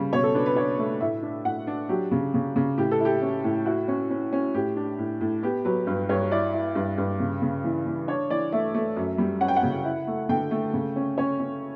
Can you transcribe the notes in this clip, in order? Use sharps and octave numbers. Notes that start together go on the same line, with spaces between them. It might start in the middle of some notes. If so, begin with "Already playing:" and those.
Already playing: C#3 G3
B2 C#5
A4
D4 B4
B4
D4 C#5
A3
A2 E5
D4
A2 F#5
D4
F#3 G4
C#3
C#3
C#3
A2 G4
A4
E4
G4
C#4
A2
E4 F#4
C#4
C#4
C#4
A2 G4
D4
A2
A2
B3 G4
F#3 B4
G2 B4
G2 C#5
E4 D5
E4
G2
G2
C#3
C#3
E3
E3
D4 C#5
E3 D5
A3 E5
A3
F#2
G3
C#4 F#5
G5
F#5
C#3
E4
A3
D3 G5
A3
C#3
C#4
C#4 C#5
C#4